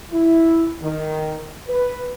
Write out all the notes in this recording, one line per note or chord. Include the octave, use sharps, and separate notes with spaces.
E4
D#3
B4